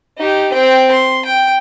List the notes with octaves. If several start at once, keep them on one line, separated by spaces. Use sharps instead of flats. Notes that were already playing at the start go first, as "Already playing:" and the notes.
D#4 G4
C4 G5
C6
G5